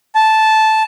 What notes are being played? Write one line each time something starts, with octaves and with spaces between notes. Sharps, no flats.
A5